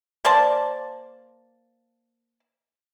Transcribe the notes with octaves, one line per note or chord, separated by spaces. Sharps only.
A#3 C5 D5 A5